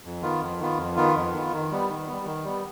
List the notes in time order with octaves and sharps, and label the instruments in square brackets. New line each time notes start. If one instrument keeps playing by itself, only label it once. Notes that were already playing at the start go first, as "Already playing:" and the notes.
[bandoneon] F2
D#3 B3 F4
F2
D#3 B3 F4
F2
D#3 B3 F4
F2
D#3 B3 F4
D#3
G3 B3
D#3
G3 B3
D#3
G3 B3